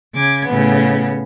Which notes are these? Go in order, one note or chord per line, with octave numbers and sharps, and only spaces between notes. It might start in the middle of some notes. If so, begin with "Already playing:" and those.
C#3 D6 G#6
A2 C#3 B3